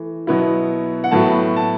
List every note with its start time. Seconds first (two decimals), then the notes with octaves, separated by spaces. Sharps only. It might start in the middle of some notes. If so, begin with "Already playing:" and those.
Already playing: E3 A3
0.27 B2 F#3 B3 E4
1.04 F#5
1.11 A2 F#3 B3 E4 A5
1.56 A5